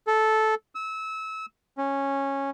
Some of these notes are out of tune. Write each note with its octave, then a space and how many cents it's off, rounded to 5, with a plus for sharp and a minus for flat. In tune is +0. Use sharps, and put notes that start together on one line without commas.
A4 -10
E6 -25
C#4 -10